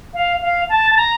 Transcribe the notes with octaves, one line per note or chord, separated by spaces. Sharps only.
F5
F5
A5
A5
A#5